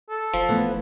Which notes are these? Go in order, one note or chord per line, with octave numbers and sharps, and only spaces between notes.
A4
F#1 F3
E3 A3 B3